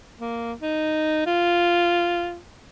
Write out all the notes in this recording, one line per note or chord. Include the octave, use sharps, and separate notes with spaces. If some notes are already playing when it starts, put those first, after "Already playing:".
A#3
D#4
F4